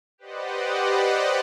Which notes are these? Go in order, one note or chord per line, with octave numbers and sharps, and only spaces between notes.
G4 B4 C5 D5 D#5 F#5